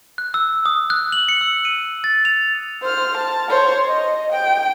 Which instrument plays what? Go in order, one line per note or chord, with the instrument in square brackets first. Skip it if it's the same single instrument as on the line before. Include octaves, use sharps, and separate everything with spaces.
[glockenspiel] F#6
E6
D#6
F#6
F#7
C#7
E6
D#7
A6
F7
[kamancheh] C5 F6
A5
C5 C#5
D#5
G5